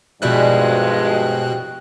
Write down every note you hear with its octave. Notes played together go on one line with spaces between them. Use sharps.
G2 B2 F3 G3 G#3 C4 E4 F#6